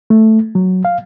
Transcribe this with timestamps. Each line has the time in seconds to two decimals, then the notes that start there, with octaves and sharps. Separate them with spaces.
0.10 A3
0.55 F#3
0.85 F5